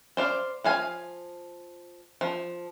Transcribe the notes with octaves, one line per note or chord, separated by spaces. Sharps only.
C5 D5 F5
F3 F5 G#5
F3